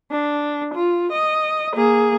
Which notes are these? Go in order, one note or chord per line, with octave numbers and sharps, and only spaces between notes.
D4
F4
D#5
A#3 G#4